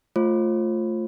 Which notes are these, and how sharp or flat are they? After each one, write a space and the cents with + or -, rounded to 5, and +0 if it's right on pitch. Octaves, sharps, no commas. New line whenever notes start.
A3 +0 F4 +0 C5 +40